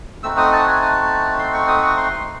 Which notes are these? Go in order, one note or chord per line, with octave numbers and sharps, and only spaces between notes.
A3 C4 D#4 F#4 E6
D#6
A5
G#5
A5
C6
C#6
D#6
C#6
C6